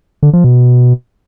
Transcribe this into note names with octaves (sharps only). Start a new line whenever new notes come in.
D3
F3
B2